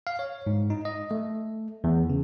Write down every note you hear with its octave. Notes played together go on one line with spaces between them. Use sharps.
F5
C#5
G#2
D#4
D#5
A3
E2
C#3